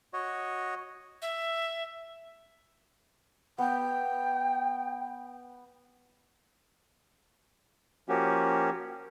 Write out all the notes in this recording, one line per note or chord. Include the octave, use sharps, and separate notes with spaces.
F#4 C#5 D#5
E5
B3 G5
F3 A#3 C#4 F#4 G4